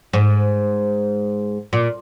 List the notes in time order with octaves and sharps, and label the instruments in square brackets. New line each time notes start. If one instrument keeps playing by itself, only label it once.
[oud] G#2
A#2